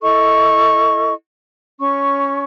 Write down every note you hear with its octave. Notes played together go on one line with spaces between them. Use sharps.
E4 A4 D#5 C#6
C#4 C#6